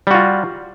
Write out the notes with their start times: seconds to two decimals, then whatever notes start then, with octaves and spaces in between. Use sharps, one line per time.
0.07 G3
0.11 F#4
0.14 F4